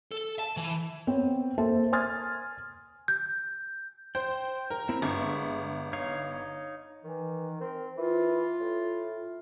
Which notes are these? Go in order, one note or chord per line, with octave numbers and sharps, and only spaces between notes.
A4
A5
E3
B3 C4 C#5
A#3 A4 C5 E5 A5
G#5 C6 D#6 F6 G#6 A6
G6
C5 G5
A#4
C4 E4
G1 G#3 E5 C#6
D#4 C#5 F5
D#3 E3
C4 A#4
E3 F4
A2